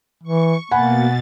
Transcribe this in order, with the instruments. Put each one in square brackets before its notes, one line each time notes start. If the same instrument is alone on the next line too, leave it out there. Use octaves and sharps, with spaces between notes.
[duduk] E3 [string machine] C#6
[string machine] B2 A6 [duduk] A#3 [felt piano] F#5 G#5 B5